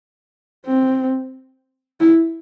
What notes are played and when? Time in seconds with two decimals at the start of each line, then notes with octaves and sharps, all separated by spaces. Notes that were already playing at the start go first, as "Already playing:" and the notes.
0.66 C4
2.00 E4